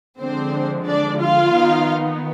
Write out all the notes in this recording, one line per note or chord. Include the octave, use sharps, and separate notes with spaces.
D3 F3 G#3 C4 D4 C5
D4 D5
F4 F5
D#3 B3 D#4